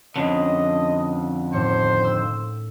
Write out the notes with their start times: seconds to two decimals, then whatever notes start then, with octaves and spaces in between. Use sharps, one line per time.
0.16 F2 D3 C#4 D#5
1.53 D#2 A2 C5 C#7
2.04 E6